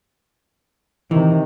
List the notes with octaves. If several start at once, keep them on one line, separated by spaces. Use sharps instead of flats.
C3 D#3 E3